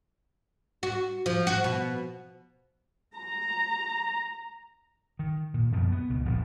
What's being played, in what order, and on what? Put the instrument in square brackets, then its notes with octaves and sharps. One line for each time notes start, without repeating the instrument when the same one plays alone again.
[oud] F#4
F3
F#4
B2
[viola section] A#5
[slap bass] D#3
A#2
F#2 B2 F3
B3
C#2 B2
E1 A#2 F3